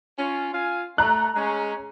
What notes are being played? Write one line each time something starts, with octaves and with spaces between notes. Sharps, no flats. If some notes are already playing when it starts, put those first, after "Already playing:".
C#4 F4
F4 F5 G#5
A3 A#5 F#6
G#3 C#4